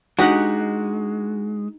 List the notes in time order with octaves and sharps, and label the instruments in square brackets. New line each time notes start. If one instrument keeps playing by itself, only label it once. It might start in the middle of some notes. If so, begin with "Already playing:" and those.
[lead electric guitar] G#3 [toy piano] D4 [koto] D#4 G4 F#5 [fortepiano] F#4